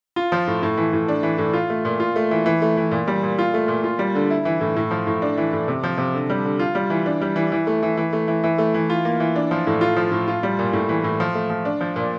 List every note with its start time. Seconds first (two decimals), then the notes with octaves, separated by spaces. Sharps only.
0.16 F4
0.32 F3
0.47 A2
0.63 A2
0.77 E3
0.93 A2
1.08 D4
1.23 E3
1.38 A2
1.53 F4
1.70 A3
1.85 A#2
2.00 F4
2.16 A3
2.31 E3
2.46 E3
2.62 A3
2.77 E3
2.91 A#2
3.07 G3
3.23 A#2
3.39 F4
3.54 A3
3.68 A#2
3.84 F4
3.99 G3
4.15 D3
4.30 E4
4.45 E3
4.61 A2
4.76 A2
4.91 F3
5.07 A2
5.22 D4
5.37 E3
5.53 A2
5.68 C3
5.84 F3
5.98 C3
6.14 D3
6.30 G3
6.45 D3
6.59 F4
6.75 G3
6.90 E3
7.06 D4
7.21 G3
7.36 E3
7.52 E3
7.67 A3
7.83 E3
7.97 E3
8.13 A3
8.28 E3
8.44 E3
8.58 A3
8.74 E3
8.90 F4
9.05 A#3
9.20 E3
9.36 D4
9.51 F3
9.67 A2
9.81 F4
9.96 F3
10.12 A2
10.28 F4
10.43 G3
10.59 A#2
10.73 A2
10.89 E3
11.04 A2
11.20 F3
11.35 A3
11.50 F3
11.65 D4
11.81 F3
11.96 A#2